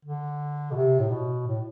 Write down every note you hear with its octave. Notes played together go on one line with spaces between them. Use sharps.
D3
B2
C3
A2
B2
A2